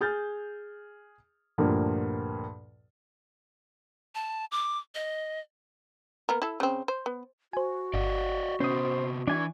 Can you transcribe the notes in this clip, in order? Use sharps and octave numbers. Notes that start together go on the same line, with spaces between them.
G#4 F6 G6 A6
D2 G2 A#2 F3 A#3
A5
D6
D#5
A#3 B3 A#4
E4 A4
C#3 C4
C5
B3
F#4 C5 G#5
G1 D5 D#5 F#5
C3 B3 C#4 C5 D#6
E3 D4 G#5 C#6